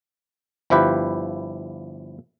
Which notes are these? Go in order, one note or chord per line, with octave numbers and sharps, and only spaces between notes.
G1 F3 E4 G4 B4